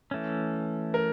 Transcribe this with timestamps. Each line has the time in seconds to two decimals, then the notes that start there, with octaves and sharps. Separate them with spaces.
0.11 E3 A3 C#4
0.94 A#4